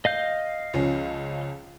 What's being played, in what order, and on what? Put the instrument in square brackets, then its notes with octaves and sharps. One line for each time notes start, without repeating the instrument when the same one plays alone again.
[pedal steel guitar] D#5 F5 G6
[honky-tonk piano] C#2 F3 C#4